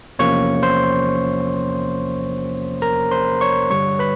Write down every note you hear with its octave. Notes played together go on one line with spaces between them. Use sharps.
E2 C3 F3 A#3 C#4 C#5 C#6
C5 C6
A#4 A#5
C5 C6
C#5 C#6
G2 D3 G3 C#5 C#6
B4 B5